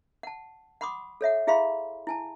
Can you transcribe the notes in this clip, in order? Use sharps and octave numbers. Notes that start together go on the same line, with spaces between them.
F#5 A5
F#5 B5 C6 D6 D#6
A4 C#5 E5 F#5
E4 G#4 E5 F5 B5 C6
E4 G#5 A5